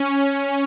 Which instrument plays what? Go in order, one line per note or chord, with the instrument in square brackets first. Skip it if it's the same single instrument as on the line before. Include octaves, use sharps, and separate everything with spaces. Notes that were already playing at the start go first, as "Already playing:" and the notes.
Already playing: [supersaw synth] C#4